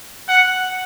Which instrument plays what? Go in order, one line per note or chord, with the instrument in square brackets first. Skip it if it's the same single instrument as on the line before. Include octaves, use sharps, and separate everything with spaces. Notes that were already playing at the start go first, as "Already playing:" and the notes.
[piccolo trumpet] F#5